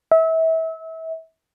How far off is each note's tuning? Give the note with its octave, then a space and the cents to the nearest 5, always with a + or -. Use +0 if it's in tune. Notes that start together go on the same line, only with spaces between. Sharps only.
E5 -30